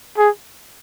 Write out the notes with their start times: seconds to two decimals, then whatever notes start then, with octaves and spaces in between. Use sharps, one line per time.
0.18 G#4